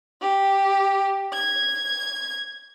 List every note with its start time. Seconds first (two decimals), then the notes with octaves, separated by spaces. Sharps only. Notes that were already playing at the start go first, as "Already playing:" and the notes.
0.21 G4
1.33 G#6